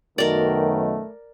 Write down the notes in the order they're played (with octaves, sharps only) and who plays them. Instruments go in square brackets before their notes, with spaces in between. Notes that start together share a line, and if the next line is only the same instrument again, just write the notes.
[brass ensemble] F#2 B2 D#3 [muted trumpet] A3 [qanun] A#4 D5